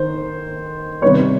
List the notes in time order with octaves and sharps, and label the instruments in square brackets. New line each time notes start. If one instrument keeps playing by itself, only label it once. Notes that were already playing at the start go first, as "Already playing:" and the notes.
Already playing: [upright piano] D#3 C5
C3 D#3 G3 B3 B4 C#5